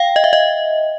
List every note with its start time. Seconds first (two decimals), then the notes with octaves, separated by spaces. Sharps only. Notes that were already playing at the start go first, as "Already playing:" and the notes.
Already playing: F5 G5
0.16 D#5
0.24 E5
0.33 D#5